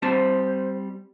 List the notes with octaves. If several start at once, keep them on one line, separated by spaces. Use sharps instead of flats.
G3 C4 C5 A5